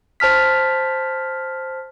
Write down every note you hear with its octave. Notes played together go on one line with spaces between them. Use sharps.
C5 A5 F6 B6